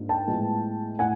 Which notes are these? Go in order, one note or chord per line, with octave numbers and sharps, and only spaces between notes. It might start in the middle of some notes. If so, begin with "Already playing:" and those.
Already playing: G#2 A#3 D4 F4
G5 A5
A2 F3 G#3 B3 E4
A2 F#5 G#5